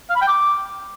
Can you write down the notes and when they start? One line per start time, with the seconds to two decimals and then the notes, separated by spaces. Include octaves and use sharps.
0.10 F5
0.16 B5
0.22 G5
0.27 D6